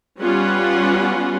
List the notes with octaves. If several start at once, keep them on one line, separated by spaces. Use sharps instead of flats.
G3 B3 C#4 F4 F#5